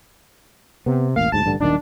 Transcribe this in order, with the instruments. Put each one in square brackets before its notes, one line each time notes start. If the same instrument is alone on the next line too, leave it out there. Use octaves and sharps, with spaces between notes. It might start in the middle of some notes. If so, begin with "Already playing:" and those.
[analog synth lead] C3 [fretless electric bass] B3
[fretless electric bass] E1 A1 A#3 [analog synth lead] F5
[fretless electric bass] D2 G#2 [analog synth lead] A5
[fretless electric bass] A1 G2 D3
[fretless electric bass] D#1 B1 D#3 [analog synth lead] D4